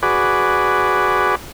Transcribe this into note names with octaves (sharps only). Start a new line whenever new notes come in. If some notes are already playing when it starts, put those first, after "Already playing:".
F#4 G#4 B4 D5